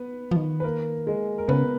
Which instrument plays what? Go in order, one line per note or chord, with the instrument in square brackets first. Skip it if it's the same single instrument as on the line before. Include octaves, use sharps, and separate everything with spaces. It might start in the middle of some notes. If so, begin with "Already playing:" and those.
Already playing: [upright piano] B3 B4
[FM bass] F3
D#3
[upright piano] B4
A#3 A#4
G#3 G#4
A#4
[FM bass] C#3 [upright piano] B3 B4